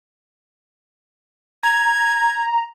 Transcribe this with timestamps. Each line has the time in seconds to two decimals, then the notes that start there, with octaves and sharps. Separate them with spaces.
1.63 A#5 G#6